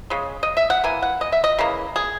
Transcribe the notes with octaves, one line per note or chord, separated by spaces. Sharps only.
C#3 G#3
D#5
E5
F#5
E3 A#3 G#5
F#5
D#5
E5
D#5
C#3 E3 A#3
G#4